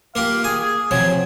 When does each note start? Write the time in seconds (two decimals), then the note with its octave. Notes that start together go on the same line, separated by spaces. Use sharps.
0.15 A#3 F4 G4 F5
0.44 G#4 G#5
0.61 G#4
0.91 C3 F3 F#3 G#5